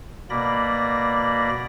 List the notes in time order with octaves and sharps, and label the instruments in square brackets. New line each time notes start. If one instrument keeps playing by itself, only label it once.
[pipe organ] B2 A#3 D5 B5 A#6